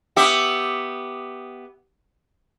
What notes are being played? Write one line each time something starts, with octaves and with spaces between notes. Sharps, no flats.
B3 G4 E5